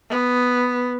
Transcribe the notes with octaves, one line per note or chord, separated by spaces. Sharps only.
B3